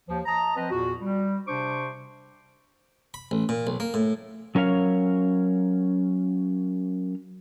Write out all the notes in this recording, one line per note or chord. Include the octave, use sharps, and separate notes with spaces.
D#2 F3
D#5 A5 A#5
F3 C4 B4 D#5
E2 A#2 F#4
G3
C3 D4 C5 C#6 D6
B5
A1
A#2
B1
A#3
A2
F#3 C#4 A#4 C#5 F5